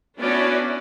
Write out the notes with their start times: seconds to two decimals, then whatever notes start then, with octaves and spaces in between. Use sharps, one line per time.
0.19 B3 C#4 D4 E4 F#4 D5